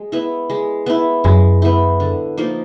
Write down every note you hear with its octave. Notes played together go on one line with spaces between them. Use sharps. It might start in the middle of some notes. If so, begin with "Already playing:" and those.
Already playing: G#3
B3 E4
G#3
B3 E4
F#2 G#3
B3 E4
D3
F3 A#3 D#4